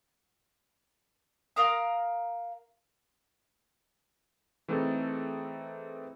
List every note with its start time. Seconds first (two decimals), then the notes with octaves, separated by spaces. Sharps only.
1.56 A#4 F5 A#5 D#6
4.68 E3 A3 C4 D#4 G#4 A4